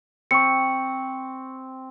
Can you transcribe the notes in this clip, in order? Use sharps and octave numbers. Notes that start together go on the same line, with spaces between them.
C4 C#6 C#7